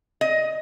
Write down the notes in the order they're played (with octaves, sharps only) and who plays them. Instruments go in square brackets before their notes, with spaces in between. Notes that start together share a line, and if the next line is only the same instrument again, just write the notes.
[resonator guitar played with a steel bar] D#5